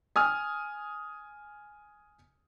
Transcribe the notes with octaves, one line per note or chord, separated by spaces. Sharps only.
G#5 D#6 F6